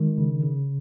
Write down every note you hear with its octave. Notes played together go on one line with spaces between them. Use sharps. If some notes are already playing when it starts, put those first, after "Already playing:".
Already playing: D#3 G#3
C#3
C#3